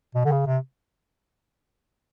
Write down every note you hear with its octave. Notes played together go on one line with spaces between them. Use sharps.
B2
D3
C#3
C3